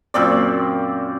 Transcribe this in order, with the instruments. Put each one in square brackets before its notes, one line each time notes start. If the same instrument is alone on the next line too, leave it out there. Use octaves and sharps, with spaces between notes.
[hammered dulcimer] F#2 A#2 C4 D5